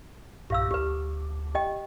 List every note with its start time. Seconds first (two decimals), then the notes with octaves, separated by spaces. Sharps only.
0.50 B1 G2 A#2 G4 F5 E6
0.71 D2 G4 B4
1.55 G4 D#5 G5